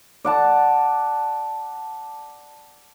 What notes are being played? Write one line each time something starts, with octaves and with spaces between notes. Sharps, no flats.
D5 F#5 A5